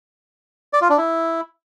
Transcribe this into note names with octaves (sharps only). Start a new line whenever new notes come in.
D5
F4
D4
E4